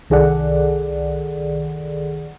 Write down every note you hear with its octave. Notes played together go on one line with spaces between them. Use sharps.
C2 D#3 G#4 A4 D5 F#5